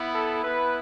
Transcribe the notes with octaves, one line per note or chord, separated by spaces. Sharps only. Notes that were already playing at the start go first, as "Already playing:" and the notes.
Already playing: B3 E4
A4
B3 E4 B4